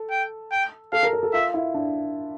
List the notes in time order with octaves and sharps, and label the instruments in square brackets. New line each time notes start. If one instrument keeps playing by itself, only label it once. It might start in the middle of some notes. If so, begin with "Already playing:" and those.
Already playing: [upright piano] A4
[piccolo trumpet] G5
G5
[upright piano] A4 [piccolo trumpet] F5
[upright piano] A#4
A#4
A4
[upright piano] F4 [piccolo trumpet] E5
[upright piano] E4
D4